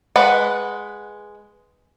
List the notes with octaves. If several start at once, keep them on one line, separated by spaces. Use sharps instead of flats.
G#3 B4 F#5